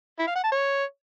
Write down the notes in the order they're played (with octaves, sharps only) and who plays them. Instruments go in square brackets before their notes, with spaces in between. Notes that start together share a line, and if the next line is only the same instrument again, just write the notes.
[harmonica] E4
F5
F#5
A5
C#5